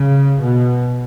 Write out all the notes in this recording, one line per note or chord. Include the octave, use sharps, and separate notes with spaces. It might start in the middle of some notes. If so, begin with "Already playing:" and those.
Already playing: C#3
B2